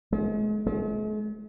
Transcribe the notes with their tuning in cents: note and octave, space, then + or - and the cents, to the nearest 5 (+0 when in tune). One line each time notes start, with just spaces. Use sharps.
G#3 +40
G#3 +45